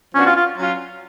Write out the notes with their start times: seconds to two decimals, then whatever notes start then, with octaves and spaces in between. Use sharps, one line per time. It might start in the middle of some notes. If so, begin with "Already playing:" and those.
0.15 F3 B3 C#4 D4 F#4
0.26 F4
0.37 F4
0.57 F#3 C#4 F4